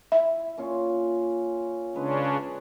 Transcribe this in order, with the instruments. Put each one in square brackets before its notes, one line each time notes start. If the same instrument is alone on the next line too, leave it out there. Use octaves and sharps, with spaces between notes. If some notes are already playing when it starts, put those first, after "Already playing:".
[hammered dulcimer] E4 [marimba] E5
[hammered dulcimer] A#2 C#4 F4
[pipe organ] C#3 C#4 D4 [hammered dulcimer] G#3 B4